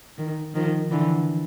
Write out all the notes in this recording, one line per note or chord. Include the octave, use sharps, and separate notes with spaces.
D#3
D#3 F3
D3 E3